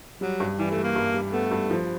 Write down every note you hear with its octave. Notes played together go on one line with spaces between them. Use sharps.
F#3 G3
G2
E3 G3
A3
G3
A#3
G2
G3
A3 B3
G2
F3